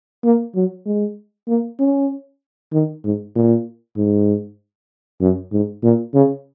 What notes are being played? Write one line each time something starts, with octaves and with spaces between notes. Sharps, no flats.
A#3
F#3
G#3
A#3
C#4
D#3
G#2
A#2
G#2
F#2
G#2
A#2
C#3